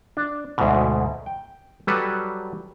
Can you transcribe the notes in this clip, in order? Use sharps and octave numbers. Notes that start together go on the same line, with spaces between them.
D4
D2 G#2 B2
G5
F#3 G3 A4 B4